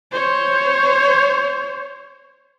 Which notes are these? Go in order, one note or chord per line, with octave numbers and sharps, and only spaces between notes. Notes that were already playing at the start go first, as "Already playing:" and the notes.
C5 C#5